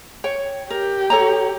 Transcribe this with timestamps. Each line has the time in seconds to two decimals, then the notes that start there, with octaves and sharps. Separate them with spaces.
0.24 C#5 G5
0.70 G4 A#4
1.10 A4 C#5 A#5